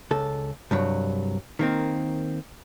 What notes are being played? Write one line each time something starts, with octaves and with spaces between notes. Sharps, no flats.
C#2 A4
C2 G2 F#3
D#3 A#3 C4